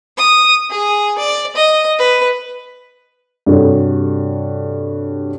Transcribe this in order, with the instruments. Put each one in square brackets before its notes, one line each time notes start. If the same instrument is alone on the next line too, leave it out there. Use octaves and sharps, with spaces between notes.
[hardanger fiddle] D#6
G#4
D5
D#5
B4
[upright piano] G2 C3 F#4 A4 C#5